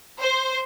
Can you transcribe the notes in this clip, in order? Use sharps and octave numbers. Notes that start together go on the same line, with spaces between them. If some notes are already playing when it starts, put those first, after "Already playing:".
C5